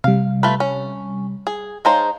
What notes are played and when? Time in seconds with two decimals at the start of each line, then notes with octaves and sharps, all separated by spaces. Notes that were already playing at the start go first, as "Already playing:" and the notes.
0.04 C3 G3 F5
0.43 A3 F4 B4
0.60 C#4
1.47 G#4
1.85 G#3 D#4 C5 C#5 F5 A5